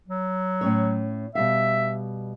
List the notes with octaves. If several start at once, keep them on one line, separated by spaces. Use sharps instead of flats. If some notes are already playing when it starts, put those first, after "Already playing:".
F#3
A2 C#4 C#5
B2 G3 E5 F5